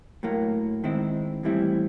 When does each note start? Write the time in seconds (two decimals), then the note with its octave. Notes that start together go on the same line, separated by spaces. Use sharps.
0.23 A2 F#3 A#3
0.84 D#3 G#3 C4 E4
1.43 A2 E3 G3 C4 E4